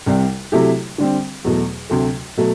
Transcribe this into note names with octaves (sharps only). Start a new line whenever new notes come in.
C2 C3 G3
C3 F#3 A3 E4 G4
D3 G3 C4
E2 B2 F#3 A3
D2 C3 F#3 A3
B2 F#3 A3